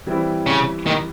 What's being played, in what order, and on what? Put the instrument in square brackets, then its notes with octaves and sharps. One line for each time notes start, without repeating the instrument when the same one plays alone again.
[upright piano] E3 G3 C4 E4
[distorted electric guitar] C#3
D#3